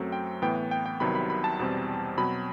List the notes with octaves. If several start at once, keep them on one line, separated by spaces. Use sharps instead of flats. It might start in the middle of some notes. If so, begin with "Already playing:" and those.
Already playing: F#2 F#3 A3 C4
G5
A2 E3 B3 G5
G5
G5
G5
C2 C3 D#3 F#3 B3 B5
B5
B5
A5
E2 B2 G3 C4
B2 F#3 C4 B5